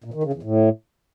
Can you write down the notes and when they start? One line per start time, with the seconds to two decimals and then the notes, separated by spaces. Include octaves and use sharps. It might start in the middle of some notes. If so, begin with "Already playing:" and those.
0.04 A#2
0.14 D#3
0.23 C#3
0.33 E2
0.43 A2